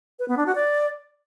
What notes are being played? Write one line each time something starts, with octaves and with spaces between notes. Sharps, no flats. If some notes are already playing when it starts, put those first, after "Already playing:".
B4
B3
D4
F#4
D5